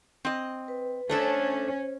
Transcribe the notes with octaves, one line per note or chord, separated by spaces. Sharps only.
C4 D#5
B4
A3 C#4 D4 A4 C5